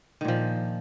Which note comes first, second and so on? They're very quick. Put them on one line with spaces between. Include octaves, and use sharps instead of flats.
D#3 A#2 F3